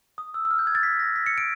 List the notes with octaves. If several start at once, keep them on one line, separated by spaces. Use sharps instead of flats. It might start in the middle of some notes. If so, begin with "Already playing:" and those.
D#6
E6
E6
F6
G6
G#6
A6
B6
A#6
B6
C#7
D7